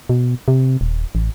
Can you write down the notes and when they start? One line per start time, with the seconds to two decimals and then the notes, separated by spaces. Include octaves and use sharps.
0.09 B2
0.48 C3
0.81 D#1
1.15 A1